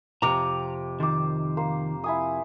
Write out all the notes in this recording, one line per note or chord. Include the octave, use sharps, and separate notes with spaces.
F2 C3 G5 A#5 D6
D#3 C5 D6
A#3 C5
E4 G#5 D#6